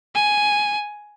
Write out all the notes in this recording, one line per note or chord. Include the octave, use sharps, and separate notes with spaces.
G#5